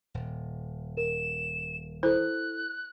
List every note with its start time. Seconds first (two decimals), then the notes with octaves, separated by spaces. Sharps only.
0.14 D#1
0.97 A#4 E7
2.03 E4 A4 C5 F#6